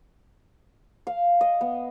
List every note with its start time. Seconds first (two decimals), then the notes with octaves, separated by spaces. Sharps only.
1.07 F5
1.41 D#5
1.61 B3